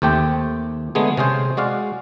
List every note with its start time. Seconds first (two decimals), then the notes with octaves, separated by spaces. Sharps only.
0.02 D#2 A3 C4 G4 G5
0.95 D3 G#3 A3 B3 G#4
1.17 C3 C#4 G#4 C5
1.57 G#3 F#4 D5 F5